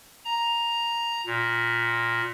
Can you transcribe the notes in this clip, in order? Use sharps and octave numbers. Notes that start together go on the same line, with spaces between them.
A#5
A#2